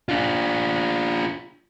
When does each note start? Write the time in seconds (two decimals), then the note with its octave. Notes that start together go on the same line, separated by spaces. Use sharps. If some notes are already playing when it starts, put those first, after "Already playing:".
0.09 D4 F4